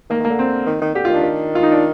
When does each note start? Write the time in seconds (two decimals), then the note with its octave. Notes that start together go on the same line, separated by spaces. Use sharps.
0.10 D#3 A#3
0.20 D#3
0.25 A#3
0.30 D3
0.39 C4
0.66 D#3
0.81 D#3
0.95 D3 G4
1.05 F4
1.10 D#3 D4
1.23 D#3
1.55 F4
1.63 D#4
1.72 D4